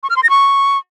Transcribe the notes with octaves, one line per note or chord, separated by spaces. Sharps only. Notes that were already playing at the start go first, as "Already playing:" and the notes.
C#6
F6
C6
A#6
C#6